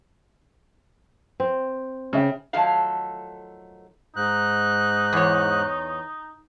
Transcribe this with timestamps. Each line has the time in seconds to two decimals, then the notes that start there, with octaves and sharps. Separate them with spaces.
1.40 C4
2.13 C#3 C#4 E5 G5
2.53 D#3 F3 F#3 A3 A4 F5
4.16 G#2 D#4 F#6
5.13 E2 C#5